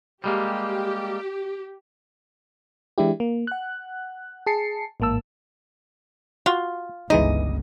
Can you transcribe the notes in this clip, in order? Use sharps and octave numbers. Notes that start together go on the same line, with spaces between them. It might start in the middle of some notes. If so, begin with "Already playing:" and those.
G3 G#3 A#3 G4
E3 G#3 D4 E4 G4
A#3
F#5 F#6
G#4 A5 C7 C#7
A1 G#2 A#3 A5 E6
F4 F#4
G1 C#2 E3 G#3 D#4 D#5